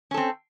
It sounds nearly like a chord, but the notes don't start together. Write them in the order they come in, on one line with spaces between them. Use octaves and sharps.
C#4 A4 C4